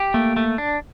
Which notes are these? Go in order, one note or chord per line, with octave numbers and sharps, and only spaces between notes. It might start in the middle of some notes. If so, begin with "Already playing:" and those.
Already playing: G4
A3 A#3
A3
D4